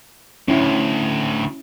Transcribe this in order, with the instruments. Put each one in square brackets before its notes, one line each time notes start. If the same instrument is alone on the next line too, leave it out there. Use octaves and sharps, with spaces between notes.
[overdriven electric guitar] D2 A2 [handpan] C#4 E4